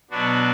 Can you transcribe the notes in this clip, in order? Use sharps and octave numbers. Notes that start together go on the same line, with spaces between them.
B2 F#3 B3 D4 F#4